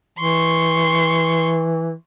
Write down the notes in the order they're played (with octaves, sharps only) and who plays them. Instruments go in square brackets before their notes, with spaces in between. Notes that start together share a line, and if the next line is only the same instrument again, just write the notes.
[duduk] E3 [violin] C6 C#6